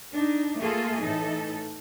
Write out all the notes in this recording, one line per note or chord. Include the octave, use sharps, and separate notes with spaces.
D4 D#4
A3 A#3 F4 G#4 A4
A2 E3 D#4 A4